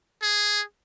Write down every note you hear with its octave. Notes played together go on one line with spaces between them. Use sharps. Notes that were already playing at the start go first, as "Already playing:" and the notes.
G#4